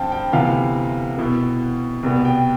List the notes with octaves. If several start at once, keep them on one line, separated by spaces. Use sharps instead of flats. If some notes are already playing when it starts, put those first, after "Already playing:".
Already playing: G2 F3 C4 G5 A5
G5
D2 C3 E3 B3 F5
B2 B3 E4
C2 B2 B3
G5